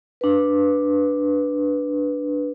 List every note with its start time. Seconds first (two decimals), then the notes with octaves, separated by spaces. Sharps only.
0.21 D4 B4